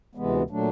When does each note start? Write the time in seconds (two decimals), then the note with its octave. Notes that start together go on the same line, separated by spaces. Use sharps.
0.15 D2 C3 E3 G#3 B3
0.50 A#2 F#3 A3 D4